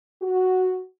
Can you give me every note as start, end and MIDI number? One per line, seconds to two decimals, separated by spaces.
0.22 0.82 66